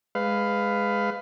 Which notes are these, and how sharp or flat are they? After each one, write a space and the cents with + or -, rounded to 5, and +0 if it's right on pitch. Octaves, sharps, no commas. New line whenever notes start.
G#3 +0 B4 +20 F5 +0